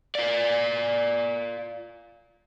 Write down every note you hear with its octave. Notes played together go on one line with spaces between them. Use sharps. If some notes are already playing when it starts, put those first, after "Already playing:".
F4 D5